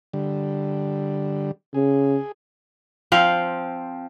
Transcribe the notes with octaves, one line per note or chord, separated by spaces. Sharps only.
D3 G3
C#3 G#4
F3 C4 F5